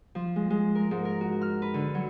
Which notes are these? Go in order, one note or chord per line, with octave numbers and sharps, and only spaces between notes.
F3
G#3
G#3
A#4
G#2
A#4
F#4
F6
B4
D3
F#3